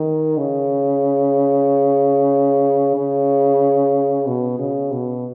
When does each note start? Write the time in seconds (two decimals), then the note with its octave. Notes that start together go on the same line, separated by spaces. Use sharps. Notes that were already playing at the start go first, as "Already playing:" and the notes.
Already playing: D#3
0.38 C#3
2.96 C#3
4.27 B2
4.59 C#3
4.92 B2